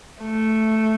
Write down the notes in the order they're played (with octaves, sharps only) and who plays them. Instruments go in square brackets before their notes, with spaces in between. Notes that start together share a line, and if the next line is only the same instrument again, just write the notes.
[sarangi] A3